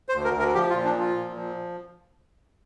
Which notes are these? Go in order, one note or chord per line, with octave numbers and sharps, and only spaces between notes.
C5
D2
A#4
D2
A#4
F3 G4
F4
A#2
D4
F3 F4
A#2
F3